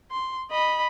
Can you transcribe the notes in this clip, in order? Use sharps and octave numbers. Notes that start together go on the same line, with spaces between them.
C6
D#5 B5